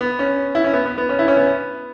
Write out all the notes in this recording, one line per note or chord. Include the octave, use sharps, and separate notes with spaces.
B3
C#4
E4
C#4
B3
B3
B3
C#4
E4
C#4
B3